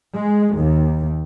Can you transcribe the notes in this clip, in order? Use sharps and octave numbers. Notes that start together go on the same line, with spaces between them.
G#3
D#2